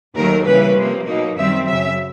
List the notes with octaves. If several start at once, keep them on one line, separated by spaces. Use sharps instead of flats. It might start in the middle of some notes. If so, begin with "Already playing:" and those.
D#2 D#3 F#3 A3 A#4
C#3 E3 G3 A#3 C#4 B4
C3 F3 A#3
B2 F#3 A#3 D#4
F#2 D#3 G3 C4 E5
F#2 C#3 F#3 E5